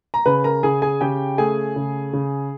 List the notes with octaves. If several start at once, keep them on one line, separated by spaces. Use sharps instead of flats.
A#5
C#3 B4 B5
A#4 A#5
C#3 G#4 G#5
G#4 G#5
C#3 G4 G5
A3 G#4 G#5
C#3
C#3